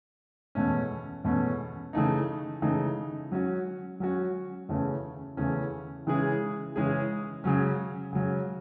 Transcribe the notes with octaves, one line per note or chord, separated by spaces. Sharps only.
E2 B2 A3 C#4
E2 B2 A3 C#4
C#3 E3 A3 D#4
C#3 E3 A3 D#4
F#3 C#4 F#4
F#3 C#4 F#4
E2 C#3 E3 A3 C#4
E2 C#3 E3 A3 C#4
C#3 E3 G#3 C#4 G#4
C#3 E3 G#3 C#4 G#4
C#3 F#3 C#4
C#3 F#3 C#4